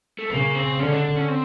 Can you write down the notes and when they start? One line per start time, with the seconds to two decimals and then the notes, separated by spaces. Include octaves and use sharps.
0.19 A3
0.30 C#3 A#3
0.55 C4
0.79 D3 C#4
0.92 D4
1.05 D4
1.16 C#4
1.29 C4